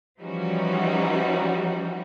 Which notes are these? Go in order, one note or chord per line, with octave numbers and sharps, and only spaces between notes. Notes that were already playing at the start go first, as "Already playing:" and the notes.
E3 F3 G3 C#4 D#4 F#4